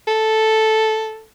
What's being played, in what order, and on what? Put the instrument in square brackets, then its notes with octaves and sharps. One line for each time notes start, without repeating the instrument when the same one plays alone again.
[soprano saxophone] A4